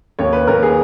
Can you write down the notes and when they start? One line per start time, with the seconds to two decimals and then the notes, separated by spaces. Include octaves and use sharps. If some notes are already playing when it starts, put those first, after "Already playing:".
0.19 D#2 C#5
0.33 B4
0.47 D#2 A#4
0.63 G#4